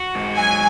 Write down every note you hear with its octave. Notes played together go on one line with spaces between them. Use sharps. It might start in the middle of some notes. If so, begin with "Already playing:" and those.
Already playing: F#4
G#2
F#3 G#5